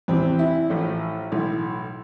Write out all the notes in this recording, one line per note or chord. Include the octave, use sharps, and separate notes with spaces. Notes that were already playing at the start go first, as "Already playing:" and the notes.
E2 C3 E3 C4
E4
A1 A2 F3
B1 A2 E3